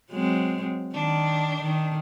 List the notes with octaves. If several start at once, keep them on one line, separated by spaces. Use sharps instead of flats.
F#3 G#3 C4
D#3 D4
D#3